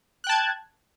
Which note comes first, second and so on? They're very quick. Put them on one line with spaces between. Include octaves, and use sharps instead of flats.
F#6 G5 A5 G#6